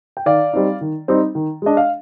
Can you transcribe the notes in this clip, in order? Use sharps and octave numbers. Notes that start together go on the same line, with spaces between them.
G5
D#3 D5 F5
G3 C4 D#4
D#3
G3 C4 D#4
D#3
G#3 D4 D#5
F5